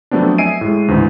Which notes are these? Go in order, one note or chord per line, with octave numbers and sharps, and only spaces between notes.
F3 F#3 A3 B3 C4 D4
D#5 E5 G#5 C7 D7 D#7
A2 G#3
D2 G#2 C#3 E3